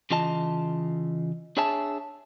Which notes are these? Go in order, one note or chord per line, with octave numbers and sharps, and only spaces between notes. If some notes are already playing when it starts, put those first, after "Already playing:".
C#3 E3 F4 D#5 A5
D4 G#4 C#5 E5 G#5 A5